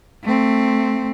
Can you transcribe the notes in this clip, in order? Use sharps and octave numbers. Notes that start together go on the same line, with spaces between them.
A3 C4